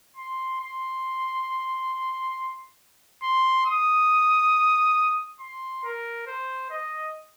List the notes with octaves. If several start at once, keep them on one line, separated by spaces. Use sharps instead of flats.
C6
C6
C6
D#6
C6
A#4
C5
D#5